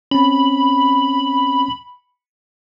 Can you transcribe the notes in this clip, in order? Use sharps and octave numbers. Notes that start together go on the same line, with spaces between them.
C4 C#4 B5